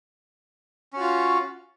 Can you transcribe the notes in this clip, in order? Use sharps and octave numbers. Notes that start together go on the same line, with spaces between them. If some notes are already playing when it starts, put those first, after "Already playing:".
C#4 F4 F#4